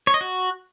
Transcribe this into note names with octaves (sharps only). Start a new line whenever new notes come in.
C#5
D#5
F#4